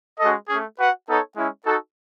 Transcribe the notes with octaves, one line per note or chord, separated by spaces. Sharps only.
G#3 C#4 F#4 A4 D#5
A3 C#4 G#4
F#4 B4 F#5
B3 D#4 A4 C#5
G#3 C#4 E4
D#4 F#4 A4